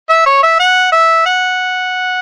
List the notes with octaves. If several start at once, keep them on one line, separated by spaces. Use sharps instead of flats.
E5
C#5
E5
F#5
E5
F#5